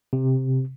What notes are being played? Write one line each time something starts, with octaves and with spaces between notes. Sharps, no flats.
C3